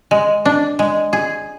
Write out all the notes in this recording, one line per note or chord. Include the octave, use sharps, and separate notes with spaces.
G#3
D4
G#3
G#4